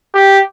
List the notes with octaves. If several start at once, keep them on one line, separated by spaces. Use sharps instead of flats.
G4